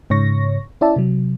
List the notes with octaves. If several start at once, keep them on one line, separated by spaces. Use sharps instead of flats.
G#2 C#3 C#5 C#6 A#6
C#4 E4 D5 E5 A5
C3 F#3